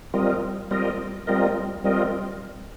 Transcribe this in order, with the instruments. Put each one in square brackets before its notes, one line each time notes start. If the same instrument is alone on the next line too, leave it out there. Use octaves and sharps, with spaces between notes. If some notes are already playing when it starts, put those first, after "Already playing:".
[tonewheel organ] G3 C4 F4 A#4 D#5
G3 C4 F4 A#4 D#5
G3 C4 F4 A#4 D#5
G3 C4 F4 A#4 D#5